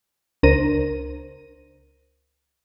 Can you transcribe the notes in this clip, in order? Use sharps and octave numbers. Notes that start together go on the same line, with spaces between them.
C#2 D4 A#4 C5 A#6 D#7